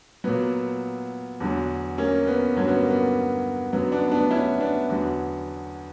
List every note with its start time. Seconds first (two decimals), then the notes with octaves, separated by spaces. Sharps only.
0.24 A#2 F#3 B3
1.40 E2 D3 F#3
1.98 A#3 C#4
2.27 B3
2.56 G2 D3 F#3 C#4
2.68 B3
2.79 A#3
2.91 B3
3.73 F#2 D3 F#3 B3
3.92 B3 D4
4.11 B3 D4
4.31 C#4 E4
4.60 B3 D4
4.89 E2 D3 F#3